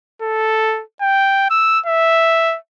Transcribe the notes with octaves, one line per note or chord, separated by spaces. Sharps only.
A4
G5
E6
E5